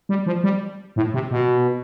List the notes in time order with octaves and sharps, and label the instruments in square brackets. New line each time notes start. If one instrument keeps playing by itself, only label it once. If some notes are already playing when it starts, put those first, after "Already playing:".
[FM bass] G3
F3
G3
A2
C3
B2